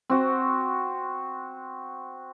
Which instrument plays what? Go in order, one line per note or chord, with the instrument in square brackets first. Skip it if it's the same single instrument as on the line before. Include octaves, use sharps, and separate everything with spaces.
[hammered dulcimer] C4 F#4